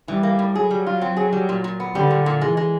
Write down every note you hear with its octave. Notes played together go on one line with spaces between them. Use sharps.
E3 G3
A#3
A2
F#3 G#4
G3
F4
C4
G#4
G3
A#2
A#2
B3
D3 G3
A#2
A#2
E3 G#3
G#3